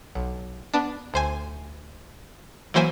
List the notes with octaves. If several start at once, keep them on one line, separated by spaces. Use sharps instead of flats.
B1
B3 D4
D2 C5 G#5
E3 F#3 A#3 C5 E5 G#5